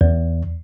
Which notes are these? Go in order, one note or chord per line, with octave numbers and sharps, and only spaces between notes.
E2